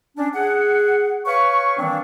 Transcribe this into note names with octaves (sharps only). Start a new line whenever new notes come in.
C#4 D4
G#4 F#5
B4 C#5 F5 C#6
D#3 E3 G3 A#3 C4 D4